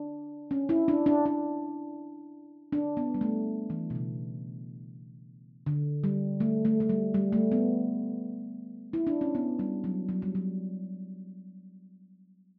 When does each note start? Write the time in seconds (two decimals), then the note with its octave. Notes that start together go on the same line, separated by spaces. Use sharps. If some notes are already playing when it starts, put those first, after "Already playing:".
Already playing: D4
0.51 C#4
0.69 E4
0.88 D4
1.06 D4
1.26 D4
2.72 D4
2.97 B3
3.14 G3
3.21 A3
3.70 E3
3.90 B2
3.95 C#3
5.66 D3
6.04 G3
6.40 A3
6.65 A3
6.80 A3
6.89 G3
7.14 G3
7.33 A3
7.52 B3
8.93 E4
9.07 D4
9.21 C#4
9.35 B3
9.59 G3
9.84 F#3
10.09 F#3
10.22 G3
10.35 F#3